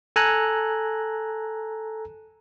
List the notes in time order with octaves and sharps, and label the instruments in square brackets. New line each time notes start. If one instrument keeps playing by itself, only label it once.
[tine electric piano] A4 G#5 A#5 F#6